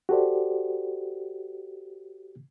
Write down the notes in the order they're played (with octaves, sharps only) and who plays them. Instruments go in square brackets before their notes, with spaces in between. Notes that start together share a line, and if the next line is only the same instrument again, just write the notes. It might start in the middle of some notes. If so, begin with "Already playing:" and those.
[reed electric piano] F#4 G4 A4 C5 D5